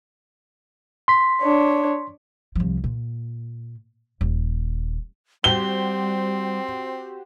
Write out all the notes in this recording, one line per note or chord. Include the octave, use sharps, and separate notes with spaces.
C6 B6
D4 C#5
C2 F3
A#2
D#1
G3 C4 F#4 G4 C5 G7